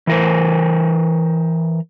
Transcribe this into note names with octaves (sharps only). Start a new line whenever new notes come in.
E3 A#4 C5